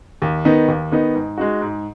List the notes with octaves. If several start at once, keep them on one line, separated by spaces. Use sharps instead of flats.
D#2
D#3 B3 D#4
D#2
D#3 B3 D#4
G#2
G#3 D#4 F#4
G#2